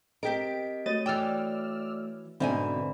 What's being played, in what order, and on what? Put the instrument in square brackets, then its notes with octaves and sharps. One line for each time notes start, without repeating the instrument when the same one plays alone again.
[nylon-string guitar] C4 G4 A#4 [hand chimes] D#5 B6 [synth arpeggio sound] D7
[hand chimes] A3 F#4 C#5 [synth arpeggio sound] D#5 A6 D#7
[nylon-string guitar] E3 G5 [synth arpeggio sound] D5 E6 F6
[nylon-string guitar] G#2 B2 G#5 [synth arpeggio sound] D3 C4 [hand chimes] D5 E5 B5